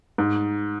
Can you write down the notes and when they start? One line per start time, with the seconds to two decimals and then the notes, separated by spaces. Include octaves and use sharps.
0.18 G#2